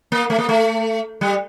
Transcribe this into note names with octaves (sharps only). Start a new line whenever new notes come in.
A#3
A3
A#3
A3
G3